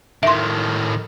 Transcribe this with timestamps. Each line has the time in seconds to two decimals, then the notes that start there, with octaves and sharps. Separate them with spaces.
0.23 A2 D#3 E5 C6